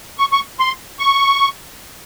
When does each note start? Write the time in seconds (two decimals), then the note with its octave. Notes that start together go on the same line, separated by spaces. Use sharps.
0.18 C#6
0.32 C#6
0.60 C6
0.99 C#6